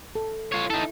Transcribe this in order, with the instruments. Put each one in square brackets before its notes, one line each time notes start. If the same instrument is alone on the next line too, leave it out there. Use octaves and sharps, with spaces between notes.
[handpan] A4
[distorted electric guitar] F4 C#5
[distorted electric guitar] D#4 A4 [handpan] E4